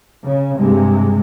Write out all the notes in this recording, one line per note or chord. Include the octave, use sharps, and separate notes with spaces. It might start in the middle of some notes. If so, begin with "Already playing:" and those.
C#3
G2 C3 G#3